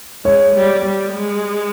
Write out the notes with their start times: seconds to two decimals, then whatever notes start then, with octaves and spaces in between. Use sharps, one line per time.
0.25 G#3 C#5
0.55 G3
0.84 G3
1.13 G#3